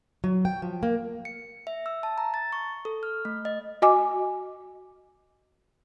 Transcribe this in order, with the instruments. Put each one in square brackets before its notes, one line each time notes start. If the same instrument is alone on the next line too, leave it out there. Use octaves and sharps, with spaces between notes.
[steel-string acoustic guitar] F#3
G5
F3
A#3
[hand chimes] C#7
E5
E6
A5
A#5
A6
C#6
A4
F6
A3
D#5
[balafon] F#4 D#5 G#5 D6